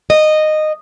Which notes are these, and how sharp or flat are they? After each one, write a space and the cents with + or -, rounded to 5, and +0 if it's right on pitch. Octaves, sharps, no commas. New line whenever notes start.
D#5 -15